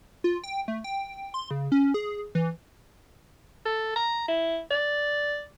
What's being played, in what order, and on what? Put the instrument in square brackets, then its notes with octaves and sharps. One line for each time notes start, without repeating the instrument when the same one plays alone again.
[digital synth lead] F4
G5
A3
G5
C6
C#3
C#4
G#4
E3
[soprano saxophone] A4
A#5
E4
D5